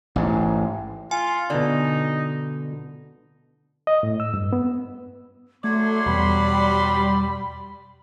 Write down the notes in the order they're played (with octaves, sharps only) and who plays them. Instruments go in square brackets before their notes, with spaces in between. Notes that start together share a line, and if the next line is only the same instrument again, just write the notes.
[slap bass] A1 G#2
[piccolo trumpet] F4 [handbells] G#5
[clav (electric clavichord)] B2 D5 [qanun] D3 [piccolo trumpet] D#4
[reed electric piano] D#5
A2
E6
G2
B3
[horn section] F#3 D5 C6 [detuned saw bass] A3 [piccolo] G#6
[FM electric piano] E2 B2 [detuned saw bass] G3 [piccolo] B5